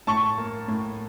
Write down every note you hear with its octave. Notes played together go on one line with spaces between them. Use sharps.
A2 A5 C#6
A#3
A2